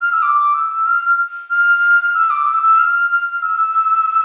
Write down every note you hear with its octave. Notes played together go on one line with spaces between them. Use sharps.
F6
E6
D6
E6
F6
F6
E6
D6
E6
E6
F6
F6
E6